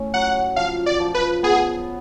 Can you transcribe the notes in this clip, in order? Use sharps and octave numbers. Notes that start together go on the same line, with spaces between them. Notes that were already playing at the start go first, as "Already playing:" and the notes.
Already playing: A2 C#4
F#3 F#5
F3 F5
D5
F3
B4
B3 G#4